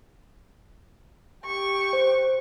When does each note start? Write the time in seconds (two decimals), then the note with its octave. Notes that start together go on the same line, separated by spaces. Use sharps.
1.45 G4 C#6
1.93 C5